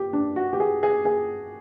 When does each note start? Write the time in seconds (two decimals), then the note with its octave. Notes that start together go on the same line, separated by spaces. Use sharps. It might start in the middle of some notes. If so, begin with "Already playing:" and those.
Already playing: G4
0.13 D4
0.36 F#4
0.53 G4
0.60 G#4
0.83 G#4
1.05 G#4